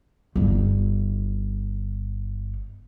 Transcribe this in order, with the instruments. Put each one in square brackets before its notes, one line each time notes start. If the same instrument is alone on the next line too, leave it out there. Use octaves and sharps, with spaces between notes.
[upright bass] G1 D#4